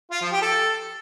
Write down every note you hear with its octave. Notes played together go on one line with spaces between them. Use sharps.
F4
F3
G4
A4